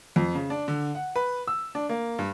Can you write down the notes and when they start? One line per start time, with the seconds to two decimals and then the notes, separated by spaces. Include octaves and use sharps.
0.16 F2
0.35 C#3
0.50 D4
0.68 D3
0.95 F#5
1.16 B4
1.47 E6
1.75 D4
1.89 A#3
2.19 G2